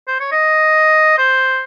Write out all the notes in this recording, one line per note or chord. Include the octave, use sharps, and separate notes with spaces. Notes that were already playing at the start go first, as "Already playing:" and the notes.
C5
C#5
D#5
C5